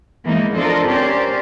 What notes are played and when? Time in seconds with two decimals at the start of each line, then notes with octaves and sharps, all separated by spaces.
0.25 E3 F3 G#3 A#3 B3 D#4
0.56 D4 F4 A4 A#4 C5 D#5
0.87 C4 C#4 G4 A#4 C5 D5